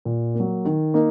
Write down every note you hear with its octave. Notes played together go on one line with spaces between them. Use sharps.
A#2
A#3
F#3
D#3
A#3 D#4